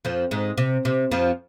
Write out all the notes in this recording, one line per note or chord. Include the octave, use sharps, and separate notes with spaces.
F2 F3
G#2 G#3
C3
C3
F2 F3